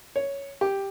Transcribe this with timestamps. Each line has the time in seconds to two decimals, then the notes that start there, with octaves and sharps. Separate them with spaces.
0.16 C#5
0.61 G4